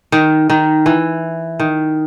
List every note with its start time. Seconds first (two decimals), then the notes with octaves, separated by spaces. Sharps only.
0.12 D#3
0.50 D#3
0.86 E3
1.59 D#3